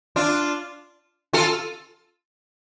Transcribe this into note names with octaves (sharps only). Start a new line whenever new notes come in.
D4 F4
F4 A4